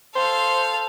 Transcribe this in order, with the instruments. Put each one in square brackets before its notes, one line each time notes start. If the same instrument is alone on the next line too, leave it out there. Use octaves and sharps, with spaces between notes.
[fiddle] A4 F5 [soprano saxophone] C5